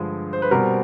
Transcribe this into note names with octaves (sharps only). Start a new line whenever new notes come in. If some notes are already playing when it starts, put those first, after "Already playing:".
Already playing: G2 D3 F3 G#3
C5
B4
B2 G3 C4 A#4